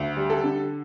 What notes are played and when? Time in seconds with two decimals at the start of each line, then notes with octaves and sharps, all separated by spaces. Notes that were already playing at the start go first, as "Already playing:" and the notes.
Already playing: D2
0.17 G3
0.30 A4
0.44 D3